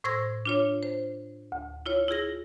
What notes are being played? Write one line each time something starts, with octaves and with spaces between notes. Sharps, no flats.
A2 C5 C6 E6 G#6 A#6
D4 F4 C#5
C5
D2
E4 F4 C#5
E4 F4 G#4 A#6